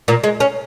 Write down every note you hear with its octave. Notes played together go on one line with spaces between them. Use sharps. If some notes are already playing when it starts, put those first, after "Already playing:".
A#2
G#3
C#4